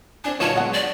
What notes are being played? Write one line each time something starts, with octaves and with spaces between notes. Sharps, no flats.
C4 D4 D5 G#5
A#2 D3 F#3 D#4 F4 B4 C#5 A5
F#3 G#3 B3 F#4 F#5
D5